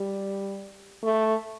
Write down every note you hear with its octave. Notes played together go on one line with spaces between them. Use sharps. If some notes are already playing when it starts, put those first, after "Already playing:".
Already playing: G3
A3